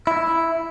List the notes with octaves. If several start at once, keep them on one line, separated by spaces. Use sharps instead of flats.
E4